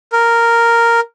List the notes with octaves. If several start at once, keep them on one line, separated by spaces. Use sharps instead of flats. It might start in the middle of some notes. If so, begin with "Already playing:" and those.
A#4